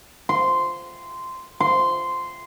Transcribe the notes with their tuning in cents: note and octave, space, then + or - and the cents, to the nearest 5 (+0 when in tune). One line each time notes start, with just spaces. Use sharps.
C6 -10
C6 -10